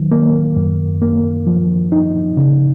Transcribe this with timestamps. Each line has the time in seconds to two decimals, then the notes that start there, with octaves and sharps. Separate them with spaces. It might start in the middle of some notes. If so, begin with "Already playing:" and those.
Already playing: D#2 D#3 F#3
0.12 A#3
0.56 F#2
1.02 A#3
1.47 F3
1.92 D#4
2.37 C#3